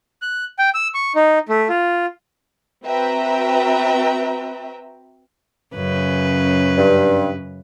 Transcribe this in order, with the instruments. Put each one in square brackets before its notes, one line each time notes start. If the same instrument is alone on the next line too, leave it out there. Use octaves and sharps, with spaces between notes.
[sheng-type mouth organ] F#6
G5
E6
C#6
D#4
A3
F4
[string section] C4 F#4 B4 E5 G5 A#5
[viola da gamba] F#2 C#3 B4
[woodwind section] G2